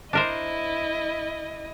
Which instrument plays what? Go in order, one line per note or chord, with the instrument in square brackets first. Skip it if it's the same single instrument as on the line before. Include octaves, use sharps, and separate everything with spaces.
[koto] D4 A#4 C5 [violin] E4 D#5